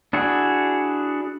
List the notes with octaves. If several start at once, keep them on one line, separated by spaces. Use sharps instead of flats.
D4 E4 F#4 G#4